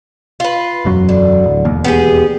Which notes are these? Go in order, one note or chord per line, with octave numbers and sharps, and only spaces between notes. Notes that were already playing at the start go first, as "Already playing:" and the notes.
F4 B4
E1 F#2 F#3
D3
D1
E1 D#2
B3 G4 G#4